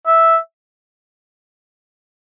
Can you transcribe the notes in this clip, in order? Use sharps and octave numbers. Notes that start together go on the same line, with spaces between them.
E5